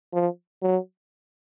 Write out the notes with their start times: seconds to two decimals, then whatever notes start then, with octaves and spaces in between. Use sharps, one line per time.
0.13 F3
0.62 F#3